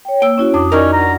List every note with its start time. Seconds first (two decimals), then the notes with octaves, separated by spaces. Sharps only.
0.05 C#5 G5
0.22 A#3 G5 E6
0.38 C#4 E4 F#4 C#5
0.54 F2 D4 D6 D#6
0.72 C#4 D#4 A#4 D5 D#5
0.93 D4 F#5 A#5